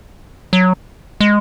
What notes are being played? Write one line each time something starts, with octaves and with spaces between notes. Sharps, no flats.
F#3
G#3